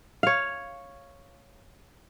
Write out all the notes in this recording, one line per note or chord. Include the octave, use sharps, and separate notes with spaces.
C#5 F5